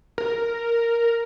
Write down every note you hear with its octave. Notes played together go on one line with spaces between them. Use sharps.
A#4